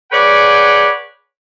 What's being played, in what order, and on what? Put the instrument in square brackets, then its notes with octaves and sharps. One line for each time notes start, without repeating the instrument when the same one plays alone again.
[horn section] G#4 B4 C#5 D5 F#5 G5